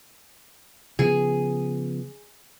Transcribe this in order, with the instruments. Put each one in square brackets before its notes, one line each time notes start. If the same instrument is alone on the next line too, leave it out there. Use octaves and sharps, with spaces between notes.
[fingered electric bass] C#3 F3 B3 [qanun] G#4